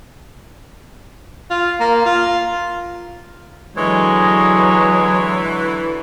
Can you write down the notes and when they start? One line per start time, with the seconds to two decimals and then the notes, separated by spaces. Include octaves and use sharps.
1.50 F4
1.80 A#3
2.06 F4
3.77 D3 E3 F#3 G#3 C#5